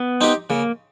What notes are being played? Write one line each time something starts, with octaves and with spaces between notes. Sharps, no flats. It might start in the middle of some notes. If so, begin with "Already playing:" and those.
Already playing: B3
C4 D#4 G4
C#3 A#3